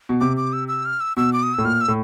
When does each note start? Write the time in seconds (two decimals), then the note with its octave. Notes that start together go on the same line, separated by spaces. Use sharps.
0.09 B2
0.20 C3 D6
0.37 D6
0.53 E6
0.68 E6
0.85 F6
1.00 E6
1.17 B2 E6
1.33 D6
1.43 D#6
1.54 A2 E6
1.64 A#2 F6
1.81 E6
1.88 A2